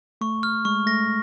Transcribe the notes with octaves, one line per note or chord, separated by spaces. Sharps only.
A3 C#6
F6
G#3 C#6
A3 A#6